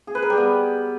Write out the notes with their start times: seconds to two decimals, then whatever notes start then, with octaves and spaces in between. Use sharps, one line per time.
0.07 G#4
0.15 B4
0.22 A#4
0.30 G3
0.38 B3